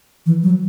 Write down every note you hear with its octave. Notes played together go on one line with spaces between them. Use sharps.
E3
F#3